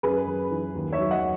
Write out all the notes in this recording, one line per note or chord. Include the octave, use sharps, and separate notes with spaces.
F#2 G#4 B4
F#2
E3
D#2
C#5 E5
F#3
D#5 F#5